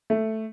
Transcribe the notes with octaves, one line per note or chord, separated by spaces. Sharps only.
A3